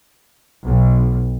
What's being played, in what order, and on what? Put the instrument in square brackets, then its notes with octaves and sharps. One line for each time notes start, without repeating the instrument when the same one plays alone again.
[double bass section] B1